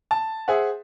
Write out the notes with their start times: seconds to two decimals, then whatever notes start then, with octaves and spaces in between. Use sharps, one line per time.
0.11 A5
0.48 G#4 C5 E5 F#5